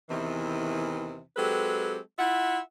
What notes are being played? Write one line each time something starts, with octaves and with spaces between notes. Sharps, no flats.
E2 C3 D#3 E3
F#3 G#3 C4 G4 A4 B4
E4 F4 E5 F#5